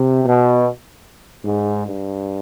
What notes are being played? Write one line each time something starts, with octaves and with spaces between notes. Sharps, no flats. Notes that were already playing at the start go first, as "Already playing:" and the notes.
Already playing: C3
B2
G#2
G2